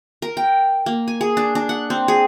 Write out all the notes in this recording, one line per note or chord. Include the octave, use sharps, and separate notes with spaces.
A#4
G5
A#3
G#5
G#4
D4
D4
F#5
C4
G#4